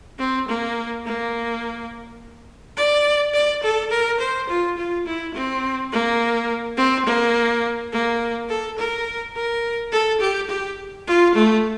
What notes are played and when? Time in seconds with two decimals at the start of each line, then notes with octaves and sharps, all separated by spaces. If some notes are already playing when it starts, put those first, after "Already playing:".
0.18 C4
0.48 A#3
1.05 A#3
2.76 D5
3.33 D5
3.63 A4
3.90 A#4
4.19 C5
4.49 F4
4.77 F4
5.06 E4
5.34 C4
5.92 A#3
6.77 C4
7.05 A#3
7.92 A#3
8.49 A4
8.78 A#4
9.35 A#4
9.92 A4
10.20 G4
10.49 G4
11.07 F4
11.35 A3